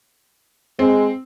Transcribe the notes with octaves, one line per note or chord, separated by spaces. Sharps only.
G#3 C4